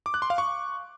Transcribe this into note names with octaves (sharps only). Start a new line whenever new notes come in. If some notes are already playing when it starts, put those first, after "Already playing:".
D6
F#6
C6
F5
C#6